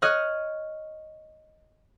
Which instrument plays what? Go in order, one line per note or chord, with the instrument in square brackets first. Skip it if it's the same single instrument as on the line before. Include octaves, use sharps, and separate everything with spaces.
[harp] C#5 D#5 D#6 F6 F#6